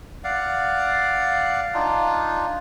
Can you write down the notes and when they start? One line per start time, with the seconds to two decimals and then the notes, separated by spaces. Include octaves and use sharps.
0.24 D5 F5 F#5
1.74 D4 D#4 F4